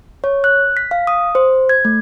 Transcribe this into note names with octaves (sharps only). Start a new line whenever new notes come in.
C#5
F#6
B6
F5
D#6
C5
G#6
A3